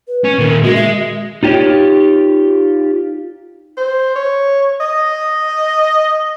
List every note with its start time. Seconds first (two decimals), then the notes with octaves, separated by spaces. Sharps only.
0.08 B4
0.24 C#4
0.39 A#2 D#3 A#4
0.63 G#3 F#4
0.75 E5
1.43 D#4 F4 G4 C#5 D5
3.77 C5
4.16 C#5
4.80 D#5